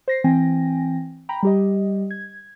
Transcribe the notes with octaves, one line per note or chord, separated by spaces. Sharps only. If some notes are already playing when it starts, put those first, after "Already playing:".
C5 A#6 C7
E3 C4 G5 G#5 A#6
G5 A#5 B5
G3 G4 D#5
G#6